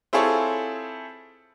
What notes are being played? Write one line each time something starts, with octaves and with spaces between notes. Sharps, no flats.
C4 E4 F4 G#4 A4 C#5